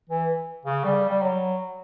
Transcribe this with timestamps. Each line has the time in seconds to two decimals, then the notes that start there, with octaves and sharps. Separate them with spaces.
0.09 E3
0.65 C#3
0.84 G3
1.09 G3
1.22 F#3